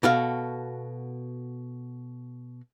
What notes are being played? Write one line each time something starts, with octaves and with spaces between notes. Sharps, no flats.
B2 F#4 A4 F5